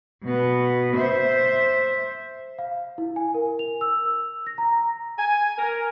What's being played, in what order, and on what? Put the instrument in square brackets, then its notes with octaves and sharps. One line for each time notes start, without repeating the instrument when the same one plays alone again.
[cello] B2 B3
C5 E5
[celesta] F5
E4
G#5
A#4
F7
E6
A#6
A#5
[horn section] G#5
A#4